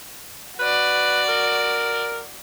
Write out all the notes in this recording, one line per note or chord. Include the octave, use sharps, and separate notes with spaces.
F#4 B4 D5
A#4